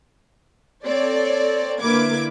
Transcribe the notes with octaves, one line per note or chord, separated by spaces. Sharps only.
C4 A4 C#5 D5
D3 A#3 E4 B4 D6 G#6